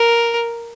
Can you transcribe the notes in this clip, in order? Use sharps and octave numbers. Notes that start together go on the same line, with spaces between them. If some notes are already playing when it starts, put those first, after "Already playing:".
Already playing: A#4